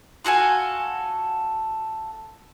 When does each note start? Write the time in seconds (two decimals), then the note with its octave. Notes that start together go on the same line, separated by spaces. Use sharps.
0.25 F4 F#4 A4 G#5